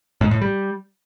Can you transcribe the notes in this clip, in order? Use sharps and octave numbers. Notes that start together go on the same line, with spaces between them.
G#2
A2
G3